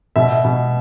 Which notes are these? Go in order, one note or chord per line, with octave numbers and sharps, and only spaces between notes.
B2 E5
B2